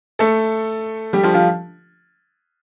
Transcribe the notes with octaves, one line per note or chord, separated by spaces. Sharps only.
A3 A4
G3 G4
F3 F4
F3 F4